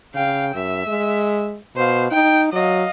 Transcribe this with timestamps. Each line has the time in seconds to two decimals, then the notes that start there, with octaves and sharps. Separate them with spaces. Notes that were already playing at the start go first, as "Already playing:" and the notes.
0.15 C#3 F5 G5
0.55 F#2 E5
0.87 G#3
1.76 B2 C5 F5
2.11 D#4 G5
2.53 F#3 D#5 F5